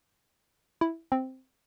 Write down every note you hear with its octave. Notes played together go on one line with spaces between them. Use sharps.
E4
C4